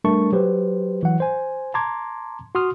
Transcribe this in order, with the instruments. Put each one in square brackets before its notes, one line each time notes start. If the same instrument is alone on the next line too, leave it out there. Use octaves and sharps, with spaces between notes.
[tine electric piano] G3 A3 D4 A#4 A5 C#6
F#3 G4 B4 C5
E3 F#3 F#5
C5 G#5
A5 A#5 C6 D6 G#6
F#4 C6 D#6 F6